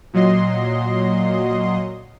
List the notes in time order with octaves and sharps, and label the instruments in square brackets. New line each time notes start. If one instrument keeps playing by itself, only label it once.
[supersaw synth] A#2 F#3 D#5 C6